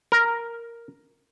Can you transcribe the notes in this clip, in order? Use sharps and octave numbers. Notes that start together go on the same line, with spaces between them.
A#4